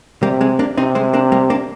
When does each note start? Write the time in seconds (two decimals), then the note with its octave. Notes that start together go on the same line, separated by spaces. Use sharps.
0.23 C3 G3 A#3
0.41 G#3 C4
0.59 A#3 D4
0.77 C3 C4 D#4
0.95 G#3 C4
1.13 A#3 D4
1.32 G3 A#3
1.50 A#3 D4